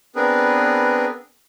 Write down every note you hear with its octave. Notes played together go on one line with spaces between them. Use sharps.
B3 C4 D4 G#4 A#4 B4